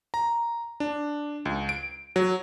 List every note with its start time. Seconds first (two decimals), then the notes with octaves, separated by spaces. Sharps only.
0.14 A#5
0.80 D4
1.45 C#2
1.69 D7
2.16 F#3